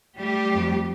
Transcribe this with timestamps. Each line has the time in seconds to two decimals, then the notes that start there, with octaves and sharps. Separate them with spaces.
0.19 G3 A3 G4
0.53 F2